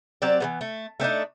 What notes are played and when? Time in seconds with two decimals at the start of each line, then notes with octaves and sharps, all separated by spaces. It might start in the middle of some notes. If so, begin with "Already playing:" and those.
0.22 F#3 C4 G4 D5
0.40 E3 G3 B3
0.61 A3
1.00 A3 C4 D4 D#4